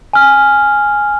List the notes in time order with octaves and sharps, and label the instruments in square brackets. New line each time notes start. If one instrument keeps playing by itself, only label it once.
[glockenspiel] G#5 F6